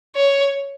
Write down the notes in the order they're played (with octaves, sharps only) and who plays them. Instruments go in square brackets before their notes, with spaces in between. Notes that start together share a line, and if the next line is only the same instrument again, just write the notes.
[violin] C#5